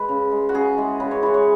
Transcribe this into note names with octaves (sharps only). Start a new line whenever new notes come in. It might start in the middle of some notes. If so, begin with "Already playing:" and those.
Already playing: G#3 B4
C#3
G#3
F#4
C#3 G#4
E3 G#3
C#3 B4
C#5
E3 G#3 B4
C#5